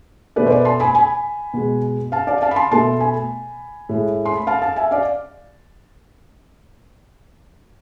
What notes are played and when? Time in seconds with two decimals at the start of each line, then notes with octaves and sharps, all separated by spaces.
0.36 B2 A3 B4 D5
0.46 C5
0.50 B4 D5
0.65 A5 C6
0.80 G#5 B5
0.95 G#5 B5
1.54 B2 G#3
2.12 F5 A5
2.27 D5 F5
2.42 F5 A5
2.51 B5
2.56 A5 C6
2.72 B2 A3 A5 C6
3.00 G#5 B5
3.89 A2 G#3
4.25 C6
4.37 B5
4.47 F5 A5
4.62 F5 A5
4.76 E5 G#5
4.91 D5 F5